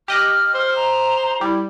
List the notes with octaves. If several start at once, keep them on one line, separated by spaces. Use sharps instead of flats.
G4 D#5 F6 F#6
C5
A#5
G3 E4